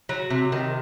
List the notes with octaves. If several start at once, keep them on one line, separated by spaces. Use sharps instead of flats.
F#3
C3
D#3